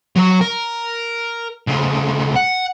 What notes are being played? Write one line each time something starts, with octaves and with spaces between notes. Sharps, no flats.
F#3 C#5
A#4
D2 C#3
F#5